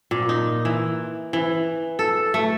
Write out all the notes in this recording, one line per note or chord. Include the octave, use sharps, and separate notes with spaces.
A#2
D#4
E3
E3
A4
A3